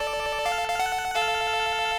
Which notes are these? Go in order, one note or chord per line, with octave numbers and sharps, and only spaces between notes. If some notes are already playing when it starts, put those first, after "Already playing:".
Already playing: A4 D5
F5
F5
F#5
A4 F5